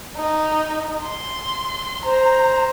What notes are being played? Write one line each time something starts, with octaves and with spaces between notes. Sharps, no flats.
D#4
C6
C5 A#5